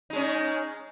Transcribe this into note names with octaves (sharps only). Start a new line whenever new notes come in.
G#3 C#4 D#4